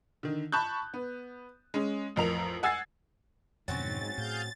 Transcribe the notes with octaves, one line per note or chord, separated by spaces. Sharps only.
D3 D#3
A5 B5 C#6 F#6 G6
B3
G#3 C#4
A1 F2 A#4 F7
F#5 G#5 E6 G#6 A6 C7
F2 G#2 B2 D3 F#3 C4 C#4 A6
A2 G#4 F5 G6